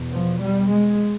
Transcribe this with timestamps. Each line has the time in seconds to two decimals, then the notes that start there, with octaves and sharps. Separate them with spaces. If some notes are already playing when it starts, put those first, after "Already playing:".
Already playing: E2 B2
0.11 F3
0.38 G3
0.68 G#3